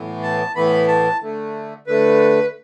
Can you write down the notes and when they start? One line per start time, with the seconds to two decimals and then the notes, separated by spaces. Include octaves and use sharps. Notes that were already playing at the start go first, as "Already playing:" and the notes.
Already playing: A2 E3 B3
0.23 A5
0.55 A2 E3 B3 B5
0.88 A5
1.21 D3 A3
1.87 D3 A3 B4